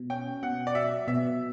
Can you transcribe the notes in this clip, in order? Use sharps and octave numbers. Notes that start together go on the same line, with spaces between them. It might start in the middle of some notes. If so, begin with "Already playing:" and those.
Already playing: B2
C#4 G5
B2 F#5
D5
F#3 E5
B2 E5